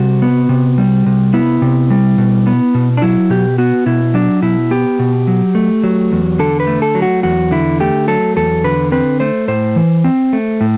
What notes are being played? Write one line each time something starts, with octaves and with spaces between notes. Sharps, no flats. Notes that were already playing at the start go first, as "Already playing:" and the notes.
Already playing: C3 G3 F#4
B3
C3
G3
C3
B3 E4
C3
G3
B2
B3
B2
D4
F#3 E4
B2 G4
B3 F#4
B2 E4
F#3 D4
B2 E4
B3 G4
B2
F#3
A3
F#3
E2
D3 A4
B4
A3
A4
F#3
F#4
E2 F#4
D3 E4
A3 G4
F#3 A4
E2 A4
D3 B4
C4 B4
A3 C5
A2 C5
E3
C4
A3
A2